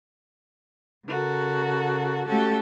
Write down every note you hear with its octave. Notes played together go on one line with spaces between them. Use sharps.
C#3 F#4 A4 A#4
A3 C#4 F#4 G4 A4